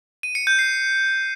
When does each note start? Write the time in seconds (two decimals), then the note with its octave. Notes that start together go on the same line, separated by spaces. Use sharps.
0.23 D#7
0.35 C#7
0.47 G6
0.59 C7